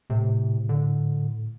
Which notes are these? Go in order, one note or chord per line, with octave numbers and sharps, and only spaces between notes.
A2 C3
D3